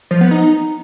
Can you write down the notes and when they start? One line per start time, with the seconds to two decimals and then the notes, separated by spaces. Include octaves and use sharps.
0.11 F3
0.21 B3
0.31 D#4